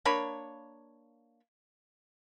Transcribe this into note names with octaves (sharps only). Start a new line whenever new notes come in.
A#3 D4 C#5 B5